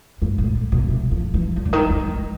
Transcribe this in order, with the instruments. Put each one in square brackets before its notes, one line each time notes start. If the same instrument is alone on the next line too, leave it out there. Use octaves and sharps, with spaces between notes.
[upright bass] G2
A2
A#2
B2
C3
F3
E3
F3
D3
D#3
D#3
D#3